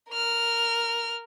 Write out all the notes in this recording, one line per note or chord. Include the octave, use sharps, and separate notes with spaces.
A#4 F6